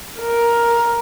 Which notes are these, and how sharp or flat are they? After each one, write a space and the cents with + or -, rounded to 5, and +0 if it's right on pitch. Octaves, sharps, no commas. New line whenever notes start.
A#4 +10